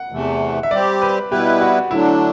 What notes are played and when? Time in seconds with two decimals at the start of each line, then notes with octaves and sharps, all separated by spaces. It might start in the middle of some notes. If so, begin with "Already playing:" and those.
Already playing: F#5
0.12 E2 C3 E3 A3
0.63 E5
0.71 G3 C4 G4 D5
1.02 B4
1.31 B2 G3 B3 E4 G4 B4
1.61 F#4
1.90 D3 F#3 A3 D4 E4